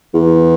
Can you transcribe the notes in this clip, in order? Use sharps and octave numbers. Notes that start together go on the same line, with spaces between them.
E2